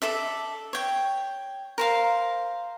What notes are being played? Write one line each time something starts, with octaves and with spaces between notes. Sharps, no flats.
A4 D5 E5
C#5 G5
A#4 C5 F5